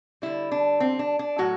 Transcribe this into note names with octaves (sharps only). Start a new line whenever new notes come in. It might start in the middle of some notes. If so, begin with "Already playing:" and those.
D3 G3 E4
D4
C4
D4
D4
A2 F#3 A3 F#4